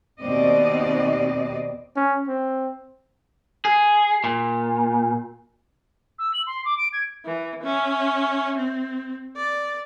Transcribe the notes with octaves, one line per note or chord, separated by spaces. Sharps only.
D#2 B2 C4 D5 D#5
C#4
C4
G#4
A#2
E6
F#7
C6
D6
D7
G#6
E3
C#4 E5
C4
D5